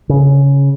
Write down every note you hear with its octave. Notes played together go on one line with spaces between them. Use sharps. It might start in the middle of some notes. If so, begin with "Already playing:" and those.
C#3